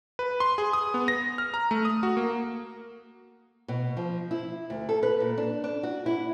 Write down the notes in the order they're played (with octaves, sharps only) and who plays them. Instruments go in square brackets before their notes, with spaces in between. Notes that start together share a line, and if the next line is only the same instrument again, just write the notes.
[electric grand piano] B4
C6
G#4
D#6
B3
A#6
F6
A#5
A3
D#6
F#4
A#3
[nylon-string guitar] B2
F3
E4
D2
A4
B4
A#2
D4
D4
F#4
E4